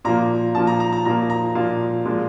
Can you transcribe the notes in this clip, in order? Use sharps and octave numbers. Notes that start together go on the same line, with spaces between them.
A#2 F3 A#3 A#5
A#2 F3 A#3 A5
A#5
A#5
A#5
A#2 F3 A#3 A#5
A#5
A#2 F3 A#3 F5
A#2 F3 G#3